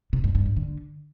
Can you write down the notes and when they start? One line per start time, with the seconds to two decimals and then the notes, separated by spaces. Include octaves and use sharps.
0.13 C3
0.24 G2
0.35 G2
0.46 G#2
0.57 D3